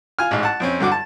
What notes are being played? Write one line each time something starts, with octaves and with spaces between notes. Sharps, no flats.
F4 G#5 F6
A1 G#2
F#5 A5
F2 C4 C#4
G2 D3 F#4 D6
A5